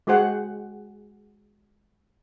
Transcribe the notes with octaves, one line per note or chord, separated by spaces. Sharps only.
G#3 F#4 G#4 C5 F#5